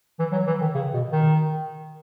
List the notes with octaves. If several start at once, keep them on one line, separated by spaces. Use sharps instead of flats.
E3
F#3
E3
D#3
C#3
B2
D#3